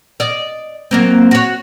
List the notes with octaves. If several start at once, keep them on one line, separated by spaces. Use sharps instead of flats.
D5 D#5
F#3 A#3 C4
F#4 C#5